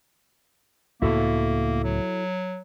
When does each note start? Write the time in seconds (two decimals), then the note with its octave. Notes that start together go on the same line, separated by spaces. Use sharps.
1.02 C#2 A2 A#3 B3 E4 F#4 A4
1.84 F#3